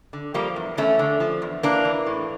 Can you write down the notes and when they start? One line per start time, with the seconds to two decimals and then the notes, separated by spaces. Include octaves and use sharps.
0.13 D3
0.34 F3 G3 A#3
0.56 E2
0.77 E2 A3 C#4
0.99 D3
1.20 F3
1.42 E2
1.63 E3 A#3 D4
1.85 E3
2.06 A2